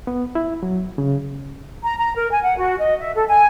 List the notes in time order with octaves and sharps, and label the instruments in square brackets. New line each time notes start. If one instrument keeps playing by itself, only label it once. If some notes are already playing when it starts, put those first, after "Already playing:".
[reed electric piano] B3
E4
F#3
C#3
[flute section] A#5
A#5
A#4
G#5
F#5
F#4
D#5
E5
A4
G#5